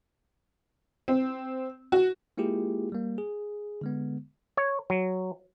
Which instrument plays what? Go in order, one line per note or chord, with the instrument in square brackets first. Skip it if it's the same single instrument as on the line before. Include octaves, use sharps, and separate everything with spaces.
[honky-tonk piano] C4
F#4
[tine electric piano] G#3 A#3 E4 F4 G4 G#4
G3 A#3
G#4
D3 G#3 B3
[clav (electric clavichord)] C#5
F#3